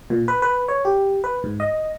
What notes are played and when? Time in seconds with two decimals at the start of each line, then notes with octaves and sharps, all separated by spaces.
0.10 A#2
0.28 B4
0.42 B4
0.68 C#5
0.85 G4
1.24 B4
1.44 G#2
1.60 D#5